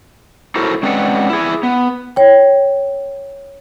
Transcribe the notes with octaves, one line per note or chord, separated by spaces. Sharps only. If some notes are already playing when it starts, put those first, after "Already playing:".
E4 F#4 A4 A#4 C5
G#3 C4 C#4 B4 D5 F#5
E4 G#4
B3
C#5 G5